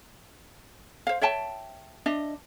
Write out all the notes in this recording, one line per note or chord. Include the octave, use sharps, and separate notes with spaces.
C5 F5
C#5 E5 G5 A5
D4 D#5 E5